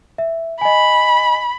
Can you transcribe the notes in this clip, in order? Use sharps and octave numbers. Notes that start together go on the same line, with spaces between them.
E5
D#5 G#5 B5